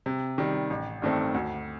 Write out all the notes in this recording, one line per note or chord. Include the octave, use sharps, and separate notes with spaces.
C3
D#3 G3
A1
G2 D#3 A3 C4
D2